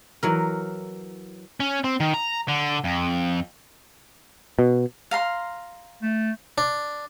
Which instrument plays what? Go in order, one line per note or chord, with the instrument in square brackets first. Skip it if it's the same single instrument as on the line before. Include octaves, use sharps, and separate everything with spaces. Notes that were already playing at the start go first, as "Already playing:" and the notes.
[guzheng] E3 F#3 A#4
[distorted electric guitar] C#4
C4
D#3
A#5
D3
F2
[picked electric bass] B2
[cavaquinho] F5 A#5 C6
[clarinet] A3
[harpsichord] D4